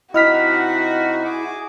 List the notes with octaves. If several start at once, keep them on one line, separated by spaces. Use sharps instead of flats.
C3 D#4 E4 F#4 D#5 F#5 F6 B6
G#4 D6